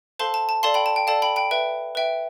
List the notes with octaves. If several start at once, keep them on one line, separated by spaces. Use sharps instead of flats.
A4 C5 F5 A5 C6
A5
A5
A4 D5 F5 A5 C6
G5 B5
A5
G5
A4 D5 F5 A5
G5 B5
G5 B5
B4 E5 G5
B4 E5 G5